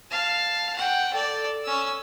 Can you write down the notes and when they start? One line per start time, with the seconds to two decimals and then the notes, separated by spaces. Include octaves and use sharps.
0.11 F5 A5
0.77 F#5 G5
1.14 A4 D5
1.64 C#4 E6